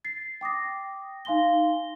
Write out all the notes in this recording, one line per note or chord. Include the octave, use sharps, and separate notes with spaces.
A6 C7
G5 D6 D#6 A#6
D#4 F5 G#5 C6 A#6 G7